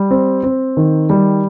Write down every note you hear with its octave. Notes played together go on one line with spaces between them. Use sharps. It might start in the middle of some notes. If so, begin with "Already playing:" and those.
Already playing: G3
C4
C4
D#3
G3